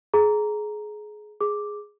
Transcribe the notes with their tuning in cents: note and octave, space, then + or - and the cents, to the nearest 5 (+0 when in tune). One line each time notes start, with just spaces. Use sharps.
G#4 +25 A#5 +0
G#4 +0 D6 +0